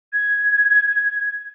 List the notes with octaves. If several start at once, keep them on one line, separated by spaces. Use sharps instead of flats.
G#6